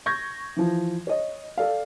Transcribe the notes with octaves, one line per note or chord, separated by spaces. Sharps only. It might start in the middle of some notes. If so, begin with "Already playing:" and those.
C#6 G6 G#6 A#6
E3 F3
C#5 D#5
A4 D5 F5